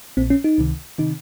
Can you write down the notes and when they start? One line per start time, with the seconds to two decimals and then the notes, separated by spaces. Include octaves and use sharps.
0.17 A#1 A#2 C4
0.30 C#4
0.44 D#4
0.58 C#2 C3 D#3
0.98 C3 D#3 D#4